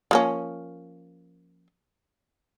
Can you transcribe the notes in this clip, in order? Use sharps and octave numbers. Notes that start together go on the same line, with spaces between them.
F3 A#3 C#4